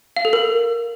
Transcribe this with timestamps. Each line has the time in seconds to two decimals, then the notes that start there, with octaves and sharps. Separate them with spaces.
0.17 F5
0.25 A4
0.33 A#4